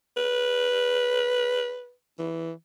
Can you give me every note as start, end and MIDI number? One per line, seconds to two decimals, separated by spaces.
0.17 1.93 71
2.19 2.52 52